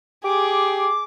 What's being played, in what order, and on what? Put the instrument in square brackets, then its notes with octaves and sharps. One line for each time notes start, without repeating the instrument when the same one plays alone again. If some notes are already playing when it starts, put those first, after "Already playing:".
[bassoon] G4 [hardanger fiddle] G#4 [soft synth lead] D6